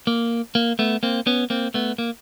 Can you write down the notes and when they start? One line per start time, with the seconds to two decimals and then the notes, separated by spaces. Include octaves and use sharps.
0.07 A#3
0.55 A#3
0.79 A3 B3
1.03 A#3 C4
1.27 B3 C#4
1.50 A#3 C4
1.74 A3 B3
1.98 A#3